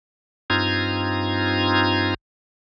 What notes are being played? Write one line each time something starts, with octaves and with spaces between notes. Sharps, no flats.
G2 C4 D#4 F4 A#5 G#6